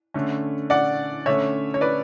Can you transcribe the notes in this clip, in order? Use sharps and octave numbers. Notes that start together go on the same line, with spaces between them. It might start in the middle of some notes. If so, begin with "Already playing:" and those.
D3 A3 C#4
D5 F#5
D3 A3 C#4 C#5 E5
C#5
B4 D5